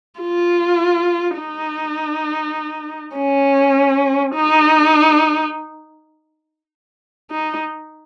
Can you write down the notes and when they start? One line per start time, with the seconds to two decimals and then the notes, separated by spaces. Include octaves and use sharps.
0.20 F4
1.38 D#4
3.16 C#4
4.35 D#4
7.31 D#4